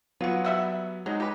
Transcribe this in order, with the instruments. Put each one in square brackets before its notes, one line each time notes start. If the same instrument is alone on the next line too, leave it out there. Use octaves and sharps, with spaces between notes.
[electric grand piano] F#3 B3 [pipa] F4 F#4
[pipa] G3 E5 F#5
[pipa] F#3 [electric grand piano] G#3 D#4
[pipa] G4 B4